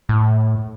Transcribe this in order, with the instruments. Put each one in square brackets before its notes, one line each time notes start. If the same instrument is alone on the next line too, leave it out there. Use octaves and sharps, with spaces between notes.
[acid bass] A2